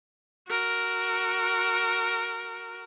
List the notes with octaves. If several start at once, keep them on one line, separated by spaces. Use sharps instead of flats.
F#4 A#4